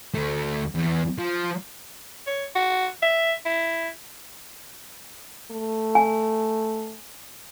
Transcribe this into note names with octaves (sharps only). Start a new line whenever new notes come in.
D2 A3
E2
F3
C#5
F#4
E5
E4
A3
G#5